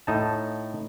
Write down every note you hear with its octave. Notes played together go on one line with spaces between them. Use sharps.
A2 D#4 A5